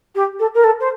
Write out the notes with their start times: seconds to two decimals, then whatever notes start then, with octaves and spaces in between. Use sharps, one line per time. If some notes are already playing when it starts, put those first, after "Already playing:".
0.15 G4
0.39 A4
0.54 A#4
0.64 A4
0.80 C5